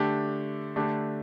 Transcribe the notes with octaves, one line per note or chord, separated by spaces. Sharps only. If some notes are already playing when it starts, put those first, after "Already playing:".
Already playing: D3 A3 D4 G4
D3 A3 D4 G4